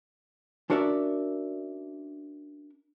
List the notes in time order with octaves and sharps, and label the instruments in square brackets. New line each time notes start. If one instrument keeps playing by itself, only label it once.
[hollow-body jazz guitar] C#4 D4 F#4 A#4 D5 E5